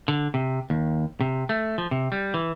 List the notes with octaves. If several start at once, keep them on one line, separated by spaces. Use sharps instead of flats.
D3
C3
D#2
C3
A3
F3
C3
G3
E3